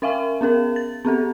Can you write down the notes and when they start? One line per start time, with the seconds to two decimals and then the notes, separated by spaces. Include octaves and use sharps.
0.02 C#4 A#4 E5 F5 G#5
0.41 B3 C#4 G#4 A#4
0.76 A6
1.05 B3 C4 G4 A4